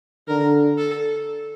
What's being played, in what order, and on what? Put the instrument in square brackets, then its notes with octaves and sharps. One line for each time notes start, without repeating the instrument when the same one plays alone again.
[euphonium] D3 [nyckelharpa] A#4
[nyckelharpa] A4